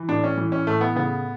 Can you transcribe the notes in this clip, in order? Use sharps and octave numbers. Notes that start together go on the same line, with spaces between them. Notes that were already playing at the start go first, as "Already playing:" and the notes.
Already playing: E3
A2 D4
C#4
E3
C#4
A2 A3
B3
C#3 B3